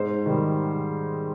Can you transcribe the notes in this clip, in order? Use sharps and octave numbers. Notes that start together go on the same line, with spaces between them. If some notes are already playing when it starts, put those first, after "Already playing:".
Already playing: G#2 C5
D#3 G3